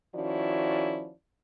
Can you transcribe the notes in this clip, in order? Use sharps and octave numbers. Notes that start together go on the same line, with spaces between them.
D#3 F3 C#4 E4 F#4 D5